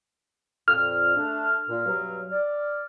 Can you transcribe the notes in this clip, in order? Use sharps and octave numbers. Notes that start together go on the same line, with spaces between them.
F2 A#2 F6
A3 D4
A#2
G2 B2 F#3
D5